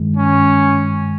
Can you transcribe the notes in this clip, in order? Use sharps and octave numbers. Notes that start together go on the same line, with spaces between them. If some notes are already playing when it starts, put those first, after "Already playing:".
Already playing: G2 D#3 G#3
C#4